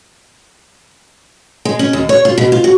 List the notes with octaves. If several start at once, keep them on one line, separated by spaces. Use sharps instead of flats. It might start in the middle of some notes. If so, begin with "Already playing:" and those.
G#3
C#4
D#2
C#5
F4
B2
F4
F#4